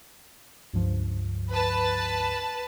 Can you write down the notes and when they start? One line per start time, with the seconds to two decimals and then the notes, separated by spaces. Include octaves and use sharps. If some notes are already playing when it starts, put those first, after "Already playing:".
0.73 C#2 G2 F3
1.51 B4 A5